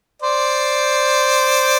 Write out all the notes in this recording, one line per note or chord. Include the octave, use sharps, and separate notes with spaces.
C5 D5